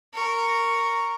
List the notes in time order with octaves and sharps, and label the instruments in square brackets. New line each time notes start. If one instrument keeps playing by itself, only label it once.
[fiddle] A#4 C#6